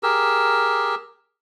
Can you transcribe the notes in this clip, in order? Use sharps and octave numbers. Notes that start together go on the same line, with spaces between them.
G4 G#4 A#4 E6